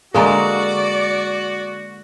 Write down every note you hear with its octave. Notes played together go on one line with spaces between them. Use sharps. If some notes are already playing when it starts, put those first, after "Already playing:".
D3 G#3 A#3 F#4 A4 D5 A#5